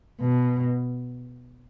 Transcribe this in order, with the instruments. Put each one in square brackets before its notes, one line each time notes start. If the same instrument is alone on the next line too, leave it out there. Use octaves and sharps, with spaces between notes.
[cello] B2